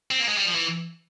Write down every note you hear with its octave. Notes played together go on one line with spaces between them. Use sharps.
C4
A#3
G#3
G3
F3
E3